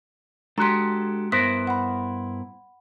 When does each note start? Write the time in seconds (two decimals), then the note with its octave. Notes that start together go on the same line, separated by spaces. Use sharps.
0.58 G#3 D4 F#4 G4 A4 A#5 C6
1.32 G2 B3 E4 A#4 C5 B6
1.67 F#5 B5